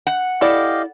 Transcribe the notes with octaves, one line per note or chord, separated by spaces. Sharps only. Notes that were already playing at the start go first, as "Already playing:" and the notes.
F#5
E4 G4 A4 D5 D#5 F5